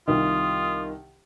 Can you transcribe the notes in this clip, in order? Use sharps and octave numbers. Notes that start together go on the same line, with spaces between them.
C2 D#3 F4 D#6